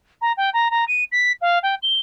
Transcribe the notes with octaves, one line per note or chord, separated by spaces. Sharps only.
A#5
G5
A#5
A#5
D#7
B6
F5
G5
G7